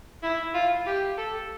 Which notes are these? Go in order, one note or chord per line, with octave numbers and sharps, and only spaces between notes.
E4
F4
G4
A4